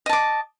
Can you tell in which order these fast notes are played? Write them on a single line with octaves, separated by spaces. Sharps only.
D#5 A5 D6